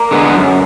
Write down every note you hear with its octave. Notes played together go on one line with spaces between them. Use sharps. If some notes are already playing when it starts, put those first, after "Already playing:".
Already playing: A#4 D5
D3 G#3 B3
F#2